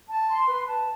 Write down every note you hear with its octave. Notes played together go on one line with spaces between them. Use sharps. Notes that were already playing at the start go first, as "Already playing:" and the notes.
A5
C6
B4
A5